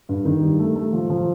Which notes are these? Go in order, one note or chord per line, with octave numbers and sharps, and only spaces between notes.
G2
D#3
G3
A3
A3
F3
F3